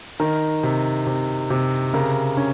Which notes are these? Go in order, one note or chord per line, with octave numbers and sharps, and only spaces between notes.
D#3 A#4
C3
C3
C3
C#3 A#4
C#4